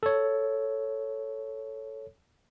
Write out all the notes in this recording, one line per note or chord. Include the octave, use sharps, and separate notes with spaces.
A4 C#5